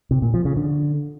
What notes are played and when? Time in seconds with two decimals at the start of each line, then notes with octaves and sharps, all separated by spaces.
0.11 C3
0.22 A#2
0.34 F3
0.45 C#3
0.57 D3